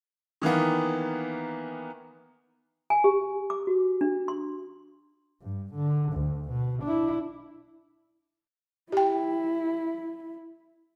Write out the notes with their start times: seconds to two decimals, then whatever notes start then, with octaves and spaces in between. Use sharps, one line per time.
0.42 D#3 E3 A#3 B3
2.90 G#5
3.04 G4
3.50 D6
3.67 F#4
4.01 D4
4.28 C6
5.42 G2
5.75 D3
6.13 D2
6.50 B2
6.83 D4 E4
8.92 E4 G4 G5